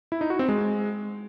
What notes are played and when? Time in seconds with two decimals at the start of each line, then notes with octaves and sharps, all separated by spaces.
0.12 E4
0.21 D#4
0.30 F#4
0.39 C4
0.48 G#3